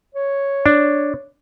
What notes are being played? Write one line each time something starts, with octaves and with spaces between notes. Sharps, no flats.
C#5
D4